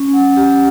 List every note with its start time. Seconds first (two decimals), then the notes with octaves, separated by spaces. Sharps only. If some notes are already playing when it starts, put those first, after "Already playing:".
Already playing: C#4
0.13 F#5
0.37 G4